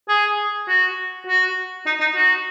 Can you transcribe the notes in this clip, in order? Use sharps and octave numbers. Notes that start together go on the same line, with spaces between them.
G#4
F#4
F#4
D#4
D#4
F#4